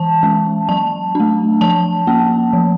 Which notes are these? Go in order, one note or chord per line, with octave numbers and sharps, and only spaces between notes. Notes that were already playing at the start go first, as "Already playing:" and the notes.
Already playing: E3 A5
G#3 C#4
F#3 A5
A3 D4
F3 A5
A#3 C#4
F3